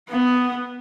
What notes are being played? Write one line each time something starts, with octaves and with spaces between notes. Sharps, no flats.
B3